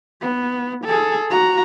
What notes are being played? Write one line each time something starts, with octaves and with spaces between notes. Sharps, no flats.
B3
G#4 A4
F#4 A#5